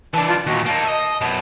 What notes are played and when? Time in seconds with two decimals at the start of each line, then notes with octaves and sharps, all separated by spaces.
0.14 E3 D4 A5
0.28 F4
0.47 D#2 A#2 F#4
0.66 A#3 D#4 A5
0.85 D#5 E5
1.21 F#2 B2 A5